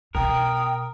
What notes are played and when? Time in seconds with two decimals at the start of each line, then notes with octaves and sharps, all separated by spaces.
0.15 B2 A#4 G5 D#6